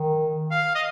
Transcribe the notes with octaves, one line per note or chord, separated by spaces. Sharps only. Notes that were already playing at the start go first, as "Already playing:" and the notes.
Already playing: D#3
F5
D#5